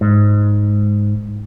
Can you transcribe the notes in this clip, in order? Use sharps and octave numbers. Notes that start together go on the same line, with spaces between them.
G#2